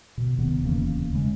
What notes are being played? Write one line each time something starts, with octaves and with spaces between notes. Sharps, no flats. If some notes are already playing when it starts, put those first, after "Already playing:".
B2
D1 C3 D#3 B3
D1 E2 C#3 A#3
C#3 G#3